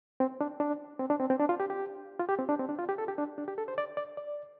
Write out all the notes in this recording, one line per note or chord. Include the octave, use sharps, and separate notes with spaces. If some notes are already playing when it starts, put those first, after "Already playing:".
C4
D4
D4
C4
D4
C4
C4
D4
F4
G4
G4
F4
G4
C4
D4
C4
D4
F4
G4
A4
G4
D4
D4
G4
A4
C5
D5
D5
D5